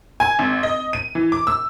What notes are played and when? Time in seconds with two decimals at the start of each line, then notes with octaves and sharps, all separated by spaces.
0.20 G#5
0.39 G#1
0.63 D#5
0.93 D#7
1.15 E3
1.32 D6
1.47 E6